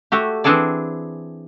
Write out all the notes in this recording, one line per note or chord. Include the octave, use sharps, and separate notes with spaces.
A3 F#4 G4
E3 C4 D4 G#4 A4 D5